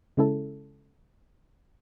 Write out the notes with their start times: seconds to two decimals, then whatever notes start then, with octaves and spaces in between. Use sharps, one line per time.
0.17 C#3 G#3 C#4 E4 A4